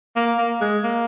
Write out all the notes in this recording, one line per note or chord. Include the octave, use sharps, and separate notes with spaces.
A#3
A#3
G#3
A#3